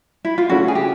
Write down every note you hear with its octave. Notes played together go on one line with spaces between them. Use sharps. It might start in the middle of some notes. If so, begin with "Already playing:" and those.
E4
F4
C#3 F#3 A3 C#4 E4 F#4
G#4
G4